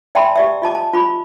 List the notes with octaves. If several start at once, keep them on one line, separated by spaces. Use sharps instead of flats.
D5 E5 G5 A5 B5 C6
G4 D5 E5
F4 D#5 A5 D6
A5
F4 B5 D6